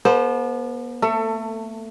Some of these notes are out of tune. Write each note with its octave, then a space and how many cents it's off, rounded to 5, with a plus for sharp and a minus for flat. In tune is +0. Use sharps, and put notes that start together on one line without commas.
B3 -40 A4 -30 C5 +0
A3 +15 A4 +30